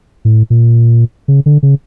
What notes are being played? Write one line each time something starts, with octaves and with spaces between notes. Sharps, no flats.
A2
A#2
C#3
D3
C#3